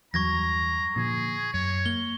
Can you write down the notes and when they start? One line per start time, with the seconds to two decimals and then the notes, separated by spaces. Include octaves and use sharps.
0.14 E2 G2 F#3 A#5 C#6 G#6 A#6
0.96 A#2 D3 F3 G#4
1.54 F#2 C#5
1.86 A#3 G7